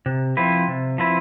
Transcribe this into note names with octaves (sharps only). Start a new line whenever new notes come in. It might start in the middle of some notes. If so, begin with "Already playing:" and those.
C3
F3 C4 E4 B4
C3
F3 C4 E4 B4